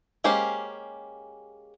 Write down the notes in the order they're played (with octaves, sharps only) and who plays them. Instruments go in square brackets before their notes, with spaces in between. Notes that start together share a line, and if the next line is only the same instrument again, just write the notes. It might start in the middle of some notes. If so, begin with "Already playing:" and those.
[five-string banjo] G#3 A#3 C#4 G4 C5